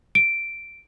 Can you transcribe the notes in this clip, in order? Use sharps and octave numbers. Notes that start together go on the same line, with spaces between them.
D7